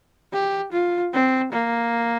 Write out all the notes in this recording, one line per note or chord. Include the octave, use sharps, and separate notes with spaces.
G4
F4
C4
A#3